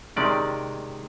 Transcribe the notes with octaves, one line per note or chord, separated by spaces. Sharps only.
C3 D#3 G#3 C#4 D5